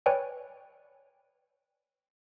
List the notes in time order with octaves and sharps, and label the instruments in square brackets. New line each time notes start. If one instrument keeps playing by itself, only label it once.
[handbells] B4 C#5 D5 G5 G#5